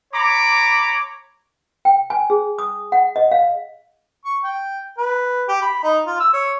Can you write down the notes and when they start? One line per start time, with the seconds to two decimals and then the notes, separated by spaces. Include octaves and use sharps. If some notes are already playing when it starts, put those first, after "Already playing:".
0.13 C#5 A#5 B5 D6
1.85 G5
2.10 G#5
2.30 G#4
2.58 D#6
2.92 F#5
3.16 D#5
3.31 F5
4.25 C#6
4.43 G5
4.98 B4
5.48 G4
5.62 B5
5.83 D#4
6.07 F4
6.20 E6
6.33 C#5